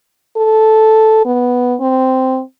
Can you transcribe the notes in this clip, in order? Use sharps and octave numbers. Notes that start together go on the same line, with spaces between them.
A4
B3
C4